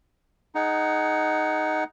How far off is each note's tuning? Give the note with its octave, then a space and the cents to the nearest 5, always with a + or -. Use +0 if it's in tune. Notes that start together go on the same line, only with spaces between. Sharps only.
D#4 +0 G#4 +15 F#5 +10